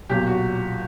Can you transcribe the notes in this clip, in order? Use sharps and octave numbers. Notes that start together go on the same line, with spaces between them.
B1 A#2 F#3 G4
F#4